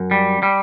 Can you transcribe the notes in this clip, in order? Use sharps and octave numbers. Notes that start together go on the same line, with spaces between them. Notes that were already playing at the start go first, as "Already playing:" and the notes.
Already playing: F#2
G3
G3